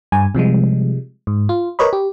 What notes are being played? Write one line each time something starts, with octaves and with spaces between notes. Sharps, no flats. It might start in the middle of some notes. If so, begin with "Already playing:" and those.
G2 G#5
C3 F3 G3 G#3
G#2
F4
A#4 B4 C#5 D#5 B5
G4